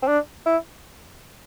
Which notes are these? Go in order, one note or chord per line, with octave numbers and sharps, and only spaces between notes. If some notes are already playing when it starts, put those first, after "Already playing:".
C4
D4
E4